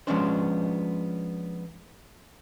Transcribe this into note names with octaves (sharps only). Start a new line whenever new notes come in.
F3 G#3 B3 C#4 D4 C5